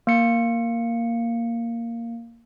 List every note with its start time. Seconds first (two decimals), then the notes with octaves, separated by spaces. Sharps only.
0.07 A#3 C#7